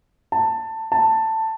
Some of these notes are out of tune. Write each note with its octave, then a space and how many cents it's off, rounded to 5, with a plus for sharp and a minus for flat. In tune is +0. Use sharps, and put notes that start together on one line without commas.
A5 +15
A5 +10